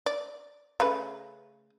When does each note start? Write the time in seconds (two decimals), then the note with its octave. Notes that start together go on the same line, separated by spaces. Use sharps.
0.06 D5
0.80 C#3 A3 B4